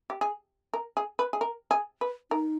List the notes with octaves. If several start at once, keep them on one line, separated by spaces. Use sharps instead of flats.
G4
G#4
A#4
G#4
B4
G#4
A#4
G#4
B4
D#4 A#4